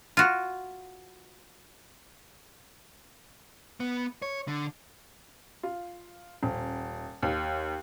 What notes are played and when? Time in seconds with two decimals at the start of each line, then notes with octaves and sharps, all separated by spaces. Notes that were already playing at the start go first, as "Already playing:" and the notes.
0.17 F4 F#4
3.80 B3
4.22 C#5
4.48 D3
5.63 F4
6.43 D#1
7.23 D#2